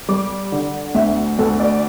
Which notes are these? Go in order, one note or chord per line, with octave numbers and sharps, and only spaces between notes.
G3 D6
D3
D2 E5
D2 A4
D5